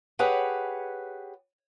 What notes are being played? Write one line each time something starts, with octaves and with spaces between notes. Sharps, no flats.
G4 G#4 B4 C#5 F#5